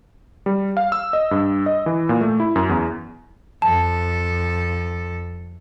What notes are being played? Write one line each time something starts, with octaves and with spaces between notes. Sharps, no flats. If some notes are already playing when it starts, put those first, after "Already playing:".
G3
F5
E6
D#5
G2
D#5
E3
A#2
A3
E4
F#2
E2
F2 A4 A5